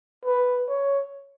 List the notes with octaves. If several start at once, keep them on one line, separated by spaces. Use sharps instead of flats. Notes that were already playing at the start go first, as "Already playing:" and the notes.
B4
C#5